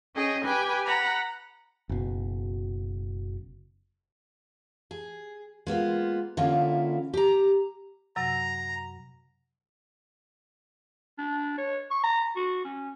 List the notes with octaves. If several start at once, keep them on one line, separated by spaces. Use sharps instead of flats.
C#4 G#4 D#5 G5
G4 B4 G5 G#5
F#5 A#5 B5
F#1 B2
G#4
G#3 A#3 B3 F4
D3 A#3 C#4 E4 F4 A4
G4 A#5
F#2 C3 F#3 A#5
D4
C#5
C#6
A#5
F#4
C#4